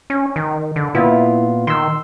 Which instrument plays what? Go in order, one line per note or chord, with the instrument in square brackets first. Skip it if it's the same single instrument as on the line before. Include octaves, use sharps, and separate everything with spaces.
[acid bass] C#4
D#3
D3
[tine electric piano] A#2 B3 F4 [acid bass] E4
[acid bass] D#3 [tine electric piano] C6 E6